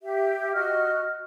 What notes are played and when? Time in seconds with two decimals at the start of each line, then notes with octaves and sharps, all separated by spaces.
0.02 G4 E5
0.54 F#4 D#5 F6